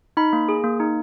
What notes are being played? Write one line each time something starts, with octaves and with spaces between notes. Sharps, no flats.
D#4 B5
A#3
G#4
A#3
D#4